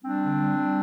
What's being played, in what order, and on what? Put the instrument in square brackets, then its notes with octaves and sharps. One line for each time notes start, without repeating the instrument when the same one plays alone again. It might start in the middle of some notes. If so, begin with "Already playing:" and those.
[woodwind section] G3 C4 D4
D3
G3
G3